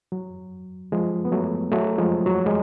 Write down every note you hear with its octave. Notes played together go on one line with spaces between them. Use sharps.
F#3
F3 G#3
B3
F#3 A3
F#3 A3
F3 G#3
F#3
G#3